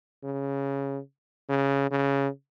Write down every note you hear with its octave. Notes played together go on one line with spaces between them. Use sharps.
C#3
C#3
C#3